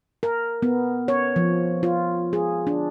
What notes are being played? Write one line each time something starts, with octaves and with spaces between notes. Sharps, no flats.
A#4
B3
C#5
F3
F4
G#4
D4